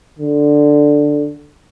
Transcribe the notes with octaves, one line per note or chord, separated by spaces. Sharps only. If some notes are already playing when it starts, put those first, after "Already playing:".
D3